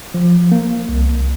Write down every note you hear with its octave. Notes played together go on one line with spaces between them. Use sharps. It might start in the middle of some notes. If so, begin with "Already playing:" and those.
F3
A#3
C2